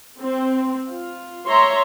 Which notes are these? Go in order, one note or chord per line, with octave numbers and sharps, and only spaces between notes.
C4
F4
C#5 E5 A#5 C6